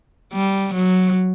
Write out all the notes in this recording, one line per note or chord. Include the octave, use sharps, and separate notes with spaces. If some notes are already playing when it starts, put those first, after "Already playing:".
G3
F#3